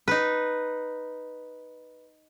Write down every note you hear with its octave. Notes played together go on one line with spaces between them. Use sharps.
D#4 B4